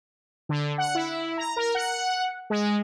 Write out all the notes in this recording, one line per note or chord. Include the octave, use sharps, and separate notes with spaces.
D3
F#5
E4
A#5
A#4
F#5
G#3